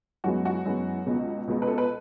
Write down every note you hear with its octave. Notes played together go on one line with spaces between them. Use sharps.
F#2 E3 G#3 B3 F#4
F#4
F#2 E3 G#3 B3
C#2 B2 G#3 B3
C#2 B2 G#3 B3
B4
A4
B4